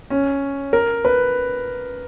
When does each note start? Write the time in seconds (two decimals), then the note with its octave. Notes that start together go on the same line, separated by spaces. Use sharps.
0.10 C#4
0.73 A#4
1.05 B4